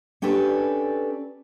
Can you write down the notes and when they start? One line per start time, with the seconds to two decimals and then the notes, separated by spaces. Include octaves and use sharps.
0.22 C#4 D4 G4 A4 B4